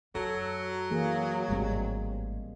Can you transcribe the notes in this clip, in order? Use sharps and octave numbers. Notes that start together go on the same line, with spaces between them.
F#2 F#3 A4
E3 A#3 G#4
G#1 A2 G3 G#3 C4